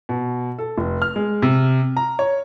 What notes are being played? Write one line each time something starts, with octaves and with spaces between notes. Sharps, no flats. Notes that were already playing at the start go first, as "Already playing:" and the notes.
B2
A4
F1
F6
G#3
C3
A#5
C#5